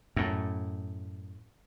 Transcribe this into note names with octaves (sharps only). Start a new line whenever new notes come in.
F#2 A2